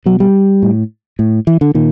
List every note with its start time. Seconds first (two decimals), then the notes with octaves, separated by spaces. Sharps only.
0.06 B2 F#3
0.20 G3
0.62 A2
1.19 A2
1.47 E3
1.61 D3
1.74 A#2 D#3